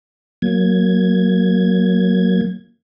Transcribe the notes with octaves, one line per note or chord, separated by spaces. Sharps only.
F#3 A#3 G#6